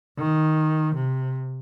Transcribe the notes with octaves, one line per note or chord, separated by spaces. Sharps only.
D#3
C3